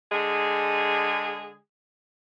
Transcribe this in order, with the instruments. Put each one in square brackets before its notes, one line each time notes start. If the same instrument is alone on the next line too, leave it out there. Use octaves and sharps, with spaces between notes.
[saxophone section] D3 G#3 G#4